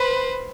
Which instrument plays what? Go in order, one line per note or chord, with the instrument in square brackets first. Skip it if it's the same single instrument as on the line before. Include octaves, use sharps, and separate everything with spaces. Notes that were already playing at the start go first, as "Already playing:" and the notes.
Already playing: [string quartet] B4 [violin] C5